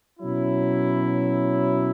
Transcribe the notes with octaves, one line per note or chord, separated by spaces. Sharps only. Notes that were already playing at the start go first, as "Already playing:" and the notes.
B2 F#3 C#4 E4